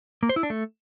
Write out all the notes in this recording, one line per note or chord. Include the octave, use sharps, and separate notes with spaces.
A#3
C5
E4
D4
A3